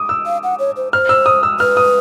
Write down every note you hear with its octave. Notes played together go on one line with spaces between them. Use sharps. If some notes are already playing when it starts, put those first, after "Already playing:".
Already playing: D6 D#6
E6
F5
F#5
C#5
C5
C5 F6
E6
D#6
E6
B4 F6
D#6